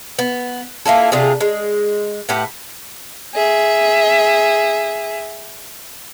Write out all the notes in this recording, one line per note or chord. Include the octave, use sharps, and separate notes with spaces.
B3
A#3 E4 F4 A4
C3 D4 F4 G#4
G#3
A2 G4 B4 F#5
G#4 E5